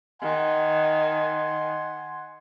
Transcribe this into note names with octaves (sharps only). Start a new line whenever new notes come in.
D#3 F#5 G#5 C6